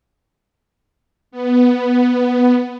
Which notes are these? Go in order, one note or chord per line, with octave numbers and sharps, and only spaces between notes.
B3